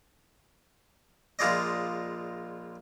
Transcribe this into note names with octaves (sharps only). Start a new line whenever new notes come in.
A#1 G#3 F4 G#4 D5 D#5